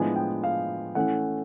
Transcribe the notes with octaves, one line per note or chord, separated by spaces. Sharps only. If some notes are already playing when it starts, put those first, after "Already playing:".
Already playing: A2 F3 G#3 B3 D4 G#5
G5
F5
E3 A3 C#4 F#5